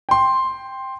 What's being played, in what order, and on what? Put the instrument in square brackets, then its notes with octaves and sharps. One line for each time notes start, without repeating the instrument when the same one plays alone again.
[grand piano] G5 C6